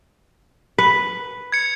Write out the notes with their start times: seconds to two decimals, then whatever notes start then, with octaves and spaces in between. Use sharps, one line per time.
0.78 B4
1.52 G#6 C#7